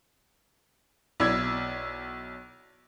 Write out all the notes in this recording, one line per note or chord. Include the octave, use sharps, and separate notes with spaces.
B1 E4 D5 E6 G#6